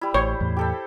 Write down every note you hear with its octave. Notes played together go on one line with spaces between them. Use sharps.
G3 E4
A1 C5 C#5
E2 A2
G4 A4 E5